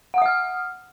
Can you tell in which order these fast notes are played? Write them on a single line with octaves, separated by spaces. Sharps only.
F#5 D#6 E5 F6